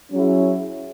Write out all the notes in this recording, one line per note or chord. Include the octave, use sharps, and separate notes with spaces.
F#3 C#4 E4 G#4